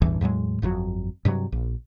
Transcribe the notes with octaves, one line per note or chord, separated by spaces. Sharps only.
A1 E2 G2 E3
E2 A2 F#3 G#3
G1 F2 B2 F#3
G2 C3 D#3 F#3
A#1